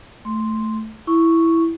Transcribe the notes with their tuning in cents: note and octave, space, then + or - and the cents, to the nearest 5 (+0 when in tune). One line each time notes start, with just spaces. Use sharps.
A3 +0 C6 +0
E4 +0 C#6 +0